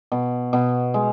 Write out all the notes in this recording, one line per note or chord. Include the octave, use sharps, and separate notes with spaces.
B2
B2
G#3